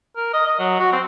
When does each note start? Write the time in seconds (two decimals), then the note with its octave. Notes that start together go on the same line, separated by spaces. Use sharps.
0.16 A#4
0.33 D#5
0.47 D#5
0.59 F#3
0.80 F#4
0.93 C4